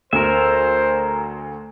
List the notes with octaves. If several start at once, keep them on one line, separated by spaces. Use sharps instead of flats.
D2 A#4 C5 E5